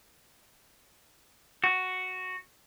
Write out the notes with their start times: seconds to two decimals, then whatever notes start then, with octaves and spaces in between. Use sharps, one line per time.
1.64 F#4